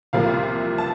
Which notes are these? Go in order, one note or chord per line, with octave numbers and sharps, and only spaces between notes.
C2 C3 F3 A#3 F5
A5